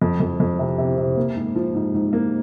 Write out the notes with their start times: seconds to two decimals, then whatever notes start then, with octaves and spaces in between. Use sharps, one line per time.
0.02 F2
0.20 F2
0.40 F2
0.59 C3
0.78 C3
0.98 C3
1.17 A#3
1.36 G#2
1.56 F3
1.74 G#2
1.94 G#2
2.13 A#3